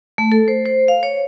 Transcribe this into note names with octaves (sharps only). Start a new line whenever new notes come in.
A3
A4
C5
C5
F5
C#5